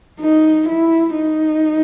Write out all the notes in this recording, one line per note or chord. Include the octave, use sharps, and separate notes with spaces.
D#4
E4
D#4